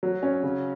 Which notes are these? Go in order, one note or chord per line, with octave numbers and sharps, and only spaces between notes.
F#3
C#4
C#3